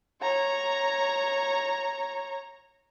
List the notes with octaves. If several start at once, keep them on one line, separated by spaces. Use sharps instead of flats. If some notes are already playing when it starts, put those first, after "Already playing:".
C#5 A#5